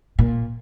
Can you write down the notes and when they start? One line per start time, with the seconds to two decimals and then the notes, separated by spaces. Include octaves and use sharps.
0.19 A#2